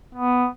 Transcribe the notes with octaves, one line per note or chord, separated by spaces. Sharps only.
B3